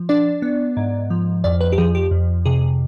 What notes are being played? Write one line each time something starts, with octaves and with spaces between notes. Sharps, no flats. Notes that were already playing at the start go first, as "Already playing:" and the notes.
Already playing: F3
D4 D5
B3
G#2
F3
F2 D5
B4
G4
F3 G#4
G4
F2
C3 G#4